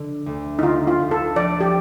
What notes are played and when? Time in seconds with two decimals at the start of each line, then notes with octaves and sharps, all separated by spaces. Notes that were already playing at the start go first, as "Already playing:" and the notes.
Already playing: D3
0.26 D2
0.59 D#4
0.63 D3 F4
0.87 F4
1.00 D2
1.11 A4
1.36 F3 D5
1.61 G4